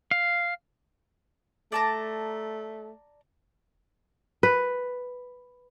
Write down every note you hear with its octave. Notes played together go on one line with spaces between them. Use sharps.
F5
A3 D5 A5 A#5
B4